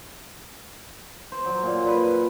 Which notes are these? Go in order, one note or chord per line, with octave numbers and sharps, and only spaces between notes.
C5
F#3
A#2
B4